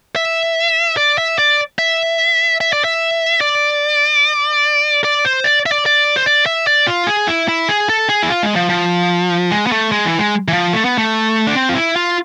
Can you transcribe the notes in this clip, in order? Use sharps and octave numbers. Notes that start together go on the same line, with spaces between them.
E5
D5
E5
D5
E5
E5
D5
E5
D5
D5
C5
D5
E5
D5
D5
C5
D5
E5
D5
F4
G#4
E4
E4
G#4
A4
G#4
E4
F4
G#3
F3
F3
G#3
B3
A3
G#3
E3
G#3
E3
F3
A3
B3
A3
D4
C4
F4
E4
F4